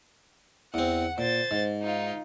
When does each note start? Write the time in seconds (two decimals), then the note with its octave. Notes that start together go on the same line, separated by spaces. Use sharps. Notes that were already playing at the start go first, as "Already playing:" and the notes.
0.74 E2 C4 F#5
1.18 A#2 C5 A6
1.51 G#2
1.82 D#4 F4